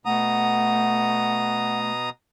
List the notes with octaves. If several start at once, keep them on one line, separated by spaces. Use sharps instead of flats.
B2 A3 F#5 A#5 D#6